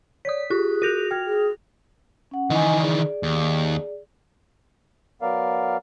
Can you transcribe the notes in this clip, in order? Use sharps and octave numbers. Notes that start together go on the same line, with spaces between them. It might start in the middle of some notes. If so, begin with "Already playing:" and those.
C#5 D5 D#6 B6
F4 G4 G#4 F#6
F#4 F#6 G6 A#6 D#7 F7
G5 F6 G#6
G#4
C#4 F#5
D#3 E3 D#5 G#5
G#4 D5
D#2
F#3 B3 A#4 D5 F5